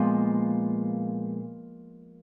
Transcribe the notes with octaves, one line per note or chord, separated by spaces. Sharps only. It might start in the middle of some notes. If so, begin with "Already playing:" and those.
Already playing: A#2 F3 G#3 B3